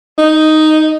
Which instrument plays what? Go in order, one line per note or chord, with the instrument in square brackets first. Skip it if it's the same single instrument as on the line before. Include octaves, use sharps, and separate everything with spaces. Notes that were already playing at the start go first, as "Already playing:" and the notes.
[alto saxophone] D#4